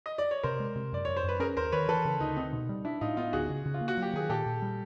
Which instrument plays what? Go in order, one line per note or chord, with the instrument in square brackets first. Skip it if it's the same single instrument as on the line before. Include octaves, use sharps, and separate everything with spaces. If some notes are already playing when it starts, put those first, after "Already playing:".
[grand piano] D#5
D5
C#5
[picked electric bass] C3 [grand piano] A#4 C5
[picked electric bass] G#3
C3
[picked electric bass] F#2 [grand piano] D5
[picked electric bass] F#2 [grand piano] C#5
[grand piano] C5
[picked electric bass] F#2 [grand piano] B4
[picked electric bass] C#4 [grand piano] G#4 A#4
[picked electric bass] D#2 [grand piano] A#4 C5
[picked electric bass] D#3 [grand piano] B4 C#5
[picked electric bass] E3 [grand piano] A4 B4
[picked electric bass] C#3
[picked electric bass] D2 [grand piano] D#4
[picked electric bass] C4 [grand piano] D#4
[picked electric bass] B2
G3
[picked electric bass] D4 [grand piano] E4
[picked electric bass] A2 [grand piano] D#4 F4
[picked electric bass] B3 [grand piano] D#4 F4
[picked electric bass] D2 [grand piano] F#4 G#4
[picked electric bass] C#3
C#3
[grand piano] F4
[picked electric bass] A#3
[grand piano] F#4
[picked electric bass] F#3 [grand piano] G4
[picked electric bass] D#3 [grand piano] G#4
[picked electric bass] A#2 [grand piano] G4 A4
[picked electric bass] A#2
G3